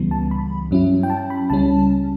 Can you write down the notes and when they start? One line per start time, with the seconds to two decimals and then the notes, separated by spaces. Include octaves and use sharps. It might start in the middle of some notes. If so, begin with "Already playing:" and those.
Already playing: C#2 C#3 E3 G3 B3
0.11 A5
0.31 B5
0.71 G2 F#3 C#4 E4
1.03 G5
1.10 A5
1.30 B5
1.50 C#2 C#3 G3 C#4 A5